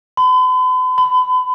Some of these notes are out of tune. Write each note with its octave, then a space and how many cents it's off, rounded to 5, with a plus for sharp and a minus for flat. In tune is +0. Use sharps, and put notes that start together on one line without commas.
B5 +45
B5 +35